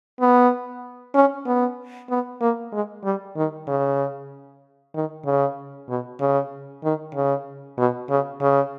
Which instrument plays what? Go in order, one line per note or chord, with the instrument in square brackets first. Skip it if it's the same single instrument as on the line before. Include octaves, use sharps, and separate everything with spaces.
[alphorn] B3
C#4
B3
B3
A#3
G#3
G3
D#3
C#3
D#3
C#3
B2
C#3
D#3
C#3
B2
C#3
C#3